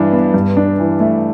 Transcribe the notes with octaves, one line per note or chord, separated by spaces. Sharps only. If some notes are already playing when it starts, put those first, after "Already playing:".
Already playing: G2 E3 D4
B3
G2
D4
E3
A3